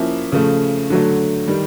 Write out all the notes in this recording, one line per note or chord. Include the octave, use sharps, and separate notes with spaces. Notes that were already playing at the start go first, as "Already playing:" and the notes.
Already playing: F3 A#3 C#4 E4
C#3 F3 A3
D3 F#3 A3
D#3 G3